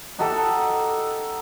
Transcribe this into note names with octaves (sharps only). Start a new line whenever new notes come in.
D#4 F#4 G4 A4